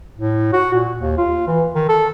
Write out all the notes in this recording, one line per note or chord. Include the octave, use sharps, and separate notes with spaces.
A2
F#4
A#2
D#2
F4
E3
D#3
A4